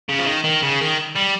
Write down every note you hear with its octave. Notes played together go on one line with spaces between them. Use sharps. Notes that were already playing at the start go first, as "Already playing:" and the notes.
C#3
F3
D#3
D#3
C#3
D#3
G3